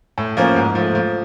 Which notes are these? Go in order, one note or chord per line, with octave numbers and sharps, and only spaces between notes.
A2
F3 A#3 C#4
G#2
F3 A3
F3